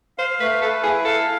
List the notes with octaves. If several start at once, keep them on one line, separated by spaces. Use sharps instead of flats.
C5 F5
A3 B4
A4 B4
E4 G#4
A4 F5